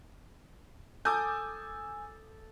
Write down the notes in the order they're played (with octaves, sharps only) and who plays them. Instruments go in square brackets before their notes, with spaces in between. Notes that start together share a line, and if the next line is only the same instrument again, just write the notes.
[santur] A4 [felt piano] G#5 [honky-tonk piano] D6 D#6 G6